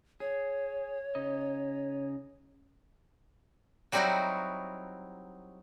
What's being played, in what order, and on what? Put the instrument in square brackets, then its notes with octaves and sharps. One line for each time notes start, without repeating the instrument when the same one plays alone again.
[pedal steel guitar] G#4 [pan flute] C#5
[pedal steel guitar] C#3 D#4 D#5
[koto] F#3 G3 C4 D#4 E4 F#4